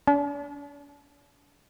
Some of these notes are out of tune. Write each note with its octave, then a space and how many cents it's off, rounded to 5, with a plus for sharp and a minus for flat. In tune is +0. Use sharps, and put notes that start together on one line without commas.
D4 -35